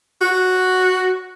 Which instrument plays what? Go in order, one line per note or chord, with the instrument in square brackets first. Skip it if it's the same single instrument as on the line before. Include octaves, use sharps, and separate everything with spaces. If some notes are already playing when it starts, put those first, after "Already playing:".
[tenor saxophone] F#4